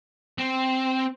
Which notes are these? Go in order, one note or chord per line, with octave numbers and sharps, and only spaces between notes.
C4